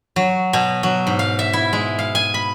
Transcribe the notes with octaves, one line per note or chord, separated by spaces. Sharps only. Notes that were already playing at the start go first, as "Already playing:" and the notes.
F#3
B2
F#3
G#2
F5
E5
E4
G#3
F5
G#5
B5